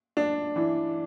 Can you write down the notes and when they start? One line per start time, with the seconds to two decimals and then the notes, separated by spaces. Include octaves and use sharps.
0.17 D4
0.56 E3